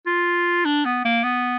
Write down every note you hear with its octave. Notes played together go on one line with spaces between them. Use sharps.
F4
D4
B3
A#3
B3